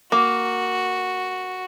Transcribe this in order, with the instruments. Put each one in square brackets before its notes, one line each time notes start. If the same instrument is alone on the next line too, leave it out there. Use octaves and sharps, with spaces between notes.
[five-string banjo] A#3 [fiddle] F#4